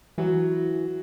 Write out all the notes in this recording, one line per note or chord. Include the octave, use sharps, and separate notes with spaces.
E3 F#3 F#4